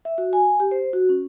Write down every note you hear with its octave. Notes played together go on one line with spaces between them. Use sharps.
E5
F#4
G#5
G4
C5
F#4
C#4